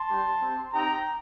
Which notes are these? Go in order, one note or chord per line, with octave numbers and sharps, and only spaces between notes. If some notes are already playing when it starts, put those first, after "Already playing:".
Already playing: A5 C6
G3 D4 G4
C4 G4
C4 D#4 G4 G5 A#5